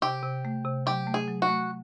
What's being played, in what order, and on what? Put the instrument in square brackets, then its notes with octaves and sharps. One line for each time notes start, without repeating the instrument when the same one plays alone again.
[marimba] C3 [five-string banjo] G4
[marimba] C3
A3
C3
[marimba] F#3 [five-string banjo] G4
[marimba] A3
[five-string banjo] G#4
[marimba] F#3
[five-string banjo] F#4
[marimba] A3